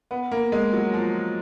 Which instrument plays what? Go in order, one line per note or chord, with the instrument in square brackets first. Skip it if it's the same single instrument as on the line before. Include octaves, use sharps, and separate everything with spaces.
[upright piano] B3
A#3
G#3
F#3
F3